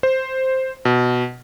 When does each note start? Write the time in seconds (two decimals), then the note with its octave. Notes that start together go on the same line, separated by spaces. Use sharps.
0.03 C5
0.85 B2